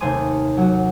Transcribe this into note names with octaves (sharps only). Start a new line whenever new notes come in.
D#2 C3 A3 C5 G#5 D#6
F#3 F#4